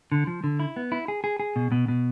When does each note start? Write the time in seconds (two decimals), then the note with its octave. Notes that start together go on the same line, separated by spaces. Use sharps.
0.12 D3
0.27 F3
0.44 D3
0.60 E4
0.76 B3
0.92 E4
1.08 G#4
1.24 G#4
1.40 G#4
1.56 B2
1.72 B2
1.88 B2